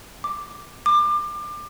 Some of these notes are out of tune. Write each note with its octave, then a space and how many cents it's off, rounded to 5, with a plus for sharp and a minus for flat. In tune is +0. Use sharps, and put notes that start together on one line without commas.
D6 +0
D6 +25